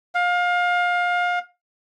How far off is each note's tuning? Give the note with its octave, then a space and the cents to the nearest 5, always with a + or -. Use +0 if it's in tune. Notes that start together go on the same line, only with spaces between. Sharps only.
F5 +25